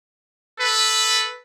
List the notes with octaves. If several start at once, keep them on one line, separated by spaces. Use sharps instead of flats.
A4 B4